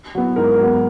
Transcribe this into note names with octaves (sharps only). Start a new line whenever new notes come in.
F#3 B3
G#2 A#4
F#3 B3